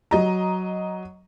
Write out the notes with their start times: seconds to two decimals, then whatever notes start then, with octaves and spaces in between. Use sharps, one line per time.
0.11 F#3 D#5 A#5